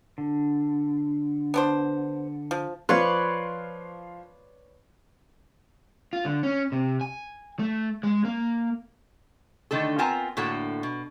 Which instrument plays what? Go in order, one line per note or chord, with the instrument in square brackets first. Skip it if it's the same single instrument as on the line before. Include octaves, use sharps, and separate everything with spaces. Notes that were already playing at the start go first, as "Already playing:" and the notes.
[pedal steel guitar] D3
[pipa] B3 D4 C5
F3
[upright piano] F3 F5 C6 [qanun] B4 C#5 D5
[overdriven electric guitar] F4
D3
C#4
C3
G#5
A3
G#3
A#3
[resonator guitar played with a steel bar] D3 D#3 A3 A4
B3 C4 F4 A#4 G#5 A#5
A2 D3 A#3 F#4 A4
B2